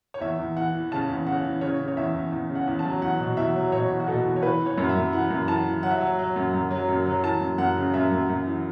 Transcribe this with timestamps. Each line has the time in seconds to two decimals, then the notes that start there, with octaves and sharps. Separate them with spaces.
0.14 C#5
0.21 E2 E5
0.39 E2
0.56 E3 F#5
0.74 E3
0.92 C#3 A5
1.09 E2
1.26 C#3 F#5
1.44 E3
1.61 C#3 C#5
1.80 C#3
1.88 C#5
1.97 E2 E5
2.14 E2
2.32 E2
2.50 C#3
2.55 F#5
2.67 E2
2.79 A5
2.85 F#3
3.02 E2 F#5
3.20 B2
3.37 E2 E5
3.55 F#3
3.72 B2 C#5
3.90 E2
4.00 F#4
4.08 B2 A4
4.25 E2
4.36 C#5
4.43 E3 B4
4.60 E3
4.66 C#5
4.78 F#2
4.89 E5
4.95 F#2
5.13 E3 F#5
5.30 F#2
5.48 E3 A5
5.65 E3
5.83 F#3 F#5
5.91 E5
5.98 F#3 F#5
6.19 F#3
6.36 F#2
6.54 F#2
6.71 F#3
6.88 F#2
7.06 F#3
7.24 E3 A5
7.41 F#2
7.58 F#2 F#5
7.77 C#3
7.94 F#2 E5
8.12 F#2
8.29 F#2
8.46 E3